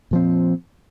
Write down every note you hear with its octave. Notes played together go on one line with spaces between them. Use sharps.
A#2 F3 C4